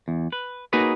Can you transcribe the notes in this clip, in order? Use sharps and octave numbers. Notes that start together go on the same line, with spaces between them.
E2
B4
A#3 D#4 F#4 G#4 B4 C#5